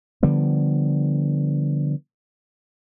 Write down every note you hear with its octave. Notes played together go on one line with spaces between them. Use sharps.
D3 F3 G3 B3